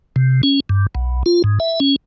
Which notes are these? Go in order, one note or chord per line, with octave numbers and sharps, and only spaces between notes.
C3
C#4
G2
B1
F4
G#2
E5
C#4